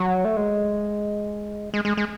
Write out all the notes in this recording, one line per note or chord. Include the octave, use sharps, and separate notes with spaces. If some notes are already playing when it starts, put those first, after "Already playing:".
Already playing: F#3
A3
G#3
G#3
G#3
G#3